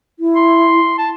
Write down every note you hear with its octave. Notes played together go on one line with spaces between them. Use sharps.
E4
C6
A5